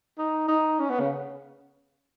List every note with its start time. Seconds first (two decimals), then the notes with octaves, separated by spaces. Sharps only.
0.18 D#4
0.48 D#4
0.79 C#4
0.89 B3
1.00 C#3